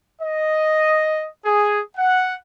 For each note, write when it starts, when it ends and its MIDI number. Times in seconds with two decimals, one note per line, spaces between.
0.22 1.26 75
1.45 1.80 68
1.97 2.35 78